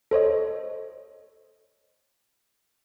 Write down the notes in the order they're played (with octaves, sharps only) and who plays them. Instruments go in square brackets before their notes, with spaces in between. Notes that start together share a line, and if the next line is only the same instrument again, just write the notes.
[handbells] A4 C5 C#5 D#5